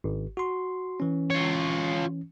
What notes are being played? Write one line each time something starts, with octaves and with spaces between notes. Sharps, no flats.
G#1
F#4 C6
E3 C#4
F4 C#5